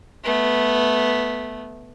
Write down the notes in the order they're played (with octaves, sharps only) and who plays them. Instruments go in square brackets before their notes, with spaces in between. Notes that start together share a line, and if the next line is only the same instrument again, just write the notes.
[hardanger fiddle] A3 B3